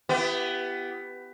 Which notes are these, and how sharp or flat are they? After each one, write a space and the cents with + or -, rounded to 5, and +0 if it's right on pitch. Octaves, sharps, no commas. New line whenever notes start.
B3 +15 E4 +40 G4 +0